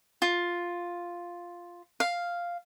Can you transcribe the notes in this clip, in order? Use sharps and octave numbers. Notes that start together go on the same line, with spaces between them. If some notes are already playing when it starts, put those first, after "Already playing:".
F4
F5